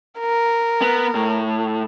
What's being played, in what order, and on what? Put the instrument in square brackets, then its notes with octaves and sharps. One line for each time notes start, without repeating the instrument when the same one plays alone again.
[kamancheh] A#4
[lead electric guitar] B3
A2